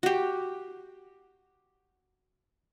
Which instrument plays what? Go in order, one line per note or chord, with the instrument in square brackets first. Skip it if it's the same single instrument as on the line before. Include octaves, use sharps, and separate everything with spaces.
[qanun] F#4 G4